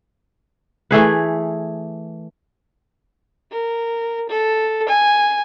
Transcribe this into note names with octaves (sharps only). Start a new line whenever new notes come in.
E3 A3 G#4 B4
A#4
A4
G#5